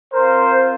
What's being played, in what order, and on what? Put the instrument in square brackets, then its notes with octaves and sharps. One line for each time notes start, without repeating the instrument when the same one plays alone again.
[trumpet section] C4 F4 A#4 C5